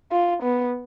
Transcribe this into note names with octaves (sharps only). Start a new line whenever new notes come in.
F4
B3